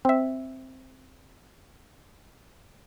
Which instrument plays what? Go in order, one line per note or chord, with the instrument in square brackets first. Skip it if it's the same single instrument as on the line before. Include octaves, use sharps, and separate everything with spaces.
[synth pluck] C4 E5